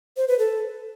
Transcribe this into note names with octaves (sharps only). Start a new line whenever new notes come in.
C5
B4
A4